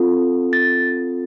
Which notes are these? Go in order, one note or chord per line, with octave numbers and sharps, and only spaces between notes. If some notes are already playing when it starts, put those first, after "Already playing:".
Already playing: C4 F4 A4
A6